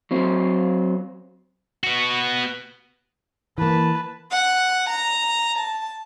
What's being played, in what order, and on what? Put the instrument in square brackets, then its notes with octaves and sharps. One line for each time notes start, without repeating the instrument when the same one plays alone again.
[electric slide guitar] F#3 C4 C5
[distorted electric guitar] B3 F#4
[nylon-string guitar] E3 A#3 [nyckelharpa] B4 A5
[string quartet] F#5
A#5
A5